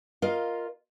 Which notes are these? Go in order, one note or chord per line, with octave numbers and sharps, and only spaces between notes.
F4 A#4 D#5 F5